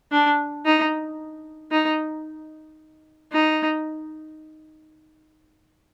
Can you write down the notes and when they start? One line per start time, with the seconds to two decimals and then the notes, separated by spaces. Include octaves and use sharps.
0.12 D4
0.65 D#4
1.72 D#4
3.33 D#4